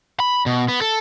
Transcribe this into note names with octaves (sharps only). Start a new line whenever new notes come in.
B5
B2
B3
A4